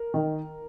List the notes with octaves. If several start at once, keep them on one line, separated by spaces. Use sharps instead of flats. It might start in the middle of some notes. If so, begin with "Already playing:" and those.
Already playing: A#4
D#3